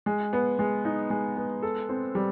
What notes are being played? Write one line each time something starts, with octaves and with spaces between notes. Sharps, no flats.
G#3
B3
G#3
D#4
G#3
B3
A4
C4
G3